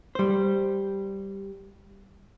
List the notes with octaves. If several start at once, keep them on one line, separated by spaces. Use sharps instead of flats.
G3 C5